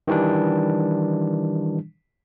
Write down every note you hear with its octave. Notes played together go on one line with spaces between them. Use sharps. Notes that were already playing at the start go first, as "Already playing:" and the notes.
D#3 E3 G3 D4